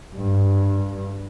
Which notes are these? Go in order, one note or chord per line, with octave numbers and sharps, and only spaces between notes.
G2